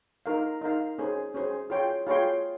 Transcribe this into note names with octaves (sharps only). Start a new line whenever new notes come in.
D#4 A#4 F5
D#4 A#4 F5
C#4 G#4 C5
C#4 G#4 C5
F4 G#4 C#5 G5 C6
F4 G#4 C#5 G5 C6